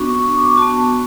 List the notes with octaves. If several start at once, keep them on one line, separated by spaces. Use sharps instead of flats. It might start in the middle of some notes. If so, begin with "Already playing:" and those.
Already playing: B3 D4 F#4 C#6
C#6
C#6
D6
C#6
B3 F#4 A5